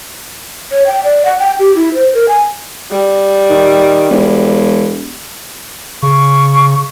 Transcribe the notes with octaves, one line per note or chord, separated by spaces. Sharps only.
C#5
G5
D5
F#5
G5
G4
E4
C5
A#4
G#5
G3
D#3
E1
C#3 C#6